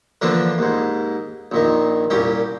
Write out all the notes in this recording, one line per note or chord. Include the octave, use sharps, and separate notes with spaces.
D3 E3 F3 A#3 D4
D#2 G#2
A#1 A#2 D#3
C2 A#2 C#4 G4